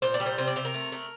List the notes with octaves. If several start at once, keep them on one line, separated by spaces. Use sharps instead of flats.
A#2 C5
D5
G3
C5
C3 C5
D5
C3 C5
A#4
A3
A3